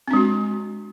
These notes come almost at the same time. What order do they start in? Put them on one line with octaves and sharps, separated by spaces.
C4 D4 G#3 F#4